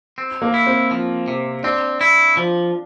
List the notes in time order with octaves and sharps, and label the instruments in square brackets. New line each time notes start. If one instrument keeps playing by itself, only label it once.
[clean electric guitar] C4
[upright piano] A#3
[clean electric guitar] E4
[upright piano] C4
[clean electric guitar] F3
C3
[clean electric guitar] C4 [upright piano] D4
[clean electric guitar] E4
F3